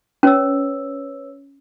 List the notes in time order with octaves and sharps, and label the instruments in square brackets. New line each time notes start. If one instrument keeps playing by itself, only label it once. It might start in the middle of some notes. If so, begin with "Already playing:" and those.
[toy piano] C#4 [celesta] B4 C#5 E6